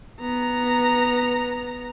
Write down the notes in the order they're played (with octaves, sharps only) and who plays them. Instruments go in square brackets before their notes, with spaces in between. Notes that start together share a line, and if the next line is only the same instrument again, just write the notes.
[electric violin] B3 A#5